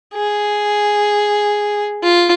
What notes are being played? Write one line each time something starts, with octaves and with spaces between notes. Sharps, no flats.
G#4
F4